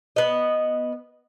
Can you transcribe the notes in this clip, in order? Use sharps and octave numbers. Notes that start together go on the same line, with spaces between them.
B3 D#5